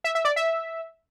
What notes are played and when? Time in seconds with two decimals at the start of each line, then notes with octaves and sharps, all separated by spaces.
0.04 E5
0.15 E5
0.25 D5
0.36 E5